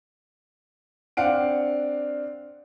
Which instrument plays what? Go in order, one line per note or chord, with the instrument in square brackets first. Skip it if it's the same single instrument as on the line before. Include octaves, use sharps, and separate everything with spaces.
[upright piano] C4 D4 F5 F#5 D7